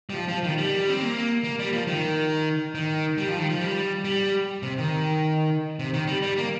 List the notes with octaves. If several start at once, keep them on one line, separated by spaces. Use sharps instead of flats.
G3
F3
F3
D#3
G3
C4
A#3
A#3
G3
F3
D#3
D#3
G3
F3
D#3
F3
G3
G3
C3
D#3
C3
D#3
G3
G3
A#3